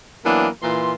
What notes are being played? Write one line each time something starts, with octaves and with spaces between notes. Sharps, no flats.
E3 F#3 A#3 B3 D4
A#2 E3 C6